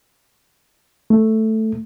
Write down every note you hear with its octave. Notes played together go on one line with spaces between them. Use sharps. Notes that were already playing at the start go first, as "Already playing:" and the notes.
A3